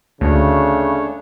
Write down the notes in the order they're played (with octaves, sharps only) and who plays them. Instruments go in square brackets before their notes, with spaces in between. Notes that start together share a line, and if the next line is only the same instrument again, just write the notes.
[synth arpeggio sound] D2 [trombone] C#3 [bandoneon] A3 D4 C#5